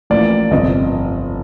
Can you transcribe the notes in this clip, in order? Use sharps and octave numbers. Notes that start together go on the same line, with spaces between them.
A1 A2 F3 A#3 D5
G1 F2 C3 D#5